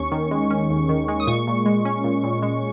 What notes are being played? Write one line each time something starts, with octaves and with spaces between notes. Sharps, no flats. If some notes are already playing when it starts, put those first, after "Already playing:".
Already playing: D#2 C#4 C#6
D#3
G#3
C#4
D#2
D#3
G#3
D#6
A#2 C#6
A#2
G#3
C#4
A#2
A#2
G#3